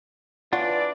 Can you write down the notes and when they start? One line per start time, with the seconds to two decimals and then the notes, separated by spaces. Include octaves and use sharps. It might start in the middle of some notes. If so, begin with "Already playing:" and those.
0.53 E3 D4 F4 C#5 D5 F#5